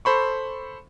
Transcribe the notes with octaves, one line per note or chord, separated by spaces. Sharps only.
A4 C5 B5 C#6